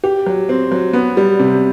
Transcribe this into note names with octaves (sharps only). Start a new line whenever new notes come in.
G4
F#3
C4
F#3
B3
G3
C3